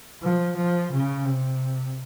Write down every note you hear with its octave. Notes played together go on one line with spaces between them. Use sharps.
F3
F3
C#3
C3